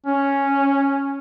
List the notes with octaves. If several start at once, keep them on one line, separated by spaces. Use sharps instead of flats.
C#4